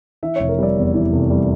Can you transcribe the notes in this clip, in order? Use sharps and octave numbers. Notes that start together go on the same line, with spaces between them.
E3 E5
F1 C#5
A#4
G3 D5
E2
E3
F1
G3